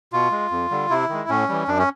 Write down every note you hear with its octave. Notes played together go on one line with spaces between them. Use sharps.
B2 F4
G#3
F2
D3 G3
C3 E4
D#3 G#3
A2 C#4
E3 G3
F#2 D4
C#4